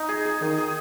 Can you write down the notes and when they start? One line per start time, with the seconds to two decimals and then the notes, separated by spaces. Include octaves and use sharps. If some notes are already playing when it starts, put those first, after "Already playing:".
Already playing: D#4
0.09 G#4
0.25 G#4
0.41 D#3 D#4
0.58 G#4